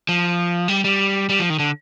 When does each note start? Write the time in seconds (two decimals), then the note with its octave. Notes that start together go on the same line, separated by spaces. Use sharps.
0.09 F3
0.68 G3
0.84 G3
1.29 G3
1.40 F3
1.50 D#3
1.59 D3